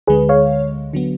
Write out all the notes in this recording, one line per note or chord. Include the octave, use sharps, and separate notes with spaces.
D2 D3 G#3 G#4 B4
C#5 F5
D3 F#3 B3